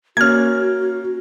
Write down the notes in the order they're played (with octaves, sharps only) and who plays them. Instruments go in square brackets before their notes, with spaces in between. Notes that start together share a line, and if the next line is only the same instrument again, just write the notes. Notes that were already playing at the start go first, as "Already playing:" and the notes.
[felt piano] A#3 C#4 [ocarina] F#4 [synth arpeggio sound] F6 G#6